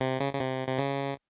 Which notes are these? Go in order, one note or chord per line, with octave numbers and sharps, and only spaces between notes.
C3
C#3
C#3
C3
C3
C#3